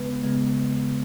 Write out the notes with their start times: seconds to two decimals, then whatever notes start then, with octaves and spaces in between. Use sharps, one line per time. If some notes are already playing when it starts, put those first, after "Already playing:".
Already playing: C#3 G#3 B3 B4
0.23 C#3 G#3 B3